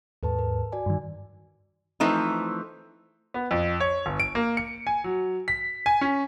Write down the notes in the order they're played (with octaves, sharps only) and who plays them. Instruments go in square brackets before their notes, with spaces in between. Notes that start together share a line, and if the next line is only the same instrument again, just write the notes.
[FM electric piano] D#2 G#2 [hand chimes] A4 B4 A5
[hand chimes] A#4
F#4 D5 G#5
[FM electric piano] G2 D#3
[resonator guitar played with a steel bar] E3 F3 A3 C4 D#4
[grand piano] B3
F2
C#5
G1
D7
A#3
C#7
G#5
F#3
B6
G#5
C#4